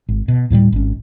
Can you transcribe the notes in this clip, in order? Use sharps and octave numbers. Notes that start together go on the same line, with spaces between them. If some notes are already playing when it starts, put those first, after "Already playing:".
G#1
B2
D2 A2 F3 G3
G#1 C#4